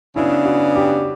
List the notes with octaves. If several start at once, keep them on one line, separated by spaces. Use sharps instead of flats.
C#3 F#3 B3 D4 E4
F#4
G4